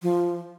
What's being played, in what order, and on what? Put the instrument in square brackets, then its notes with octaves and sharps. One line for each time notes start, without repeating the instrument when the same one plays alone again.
[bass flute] F3